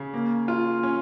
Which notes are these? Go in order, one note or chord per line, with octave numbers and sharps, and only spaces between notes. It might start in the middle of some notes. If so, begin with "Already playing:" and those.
Already playing: C#3
A#3
F4
C#4